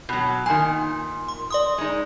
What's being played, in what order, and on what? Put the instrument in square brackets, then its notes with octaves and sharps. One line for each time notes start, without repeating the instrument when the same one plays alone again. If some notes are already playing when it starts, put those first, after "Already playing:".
[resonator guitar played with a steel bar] B2 F#3
[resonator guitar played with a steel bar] A#2 D#3 [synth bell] G#5
[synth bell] C6
D5 C6 D#6
[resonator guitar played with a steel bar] G#3 D#4